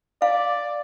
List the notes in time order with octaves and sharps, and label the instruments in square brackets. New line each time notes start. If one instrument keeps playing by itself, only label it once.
[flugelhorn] D5 [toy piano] F5